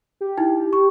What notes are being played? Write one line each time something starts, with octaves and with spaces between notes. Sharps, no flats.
G4
D#4 E4
C#6